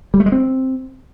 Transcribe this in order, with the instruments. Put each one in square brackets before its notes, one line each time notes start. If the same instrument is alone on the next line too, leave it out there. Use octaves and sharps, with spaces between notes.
[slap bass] G3
A3
G#3
C4